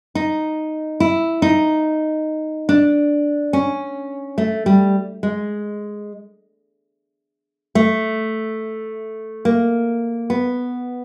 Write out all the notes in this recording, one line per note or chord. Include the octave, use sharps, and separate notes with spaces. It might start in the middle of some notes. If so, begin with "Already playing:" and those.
D#4
E4
D#4
D4
C#4
A3
G3
G#3
A3
A#3
B3